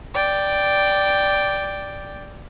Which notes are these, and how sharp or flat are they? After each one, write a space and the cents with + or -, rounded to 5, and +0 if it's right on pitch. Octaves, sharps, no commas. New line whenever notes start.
D5 +0 G5 +0